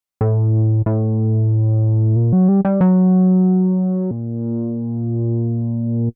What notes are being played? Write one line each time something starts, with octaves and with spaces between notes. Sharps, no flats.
A2
A2
A#2
F#3
G3
G3
F#3
A#2